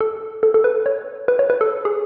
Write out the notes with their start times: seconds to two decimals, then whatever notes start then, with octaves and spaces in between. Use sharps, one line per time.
0.01 A4
0.43 A4
0.54 A4
0.64 B4
0.86 C#5
1.28 B4
1.39 C#5
1.50 B4
1.61 A4
1.85 G#4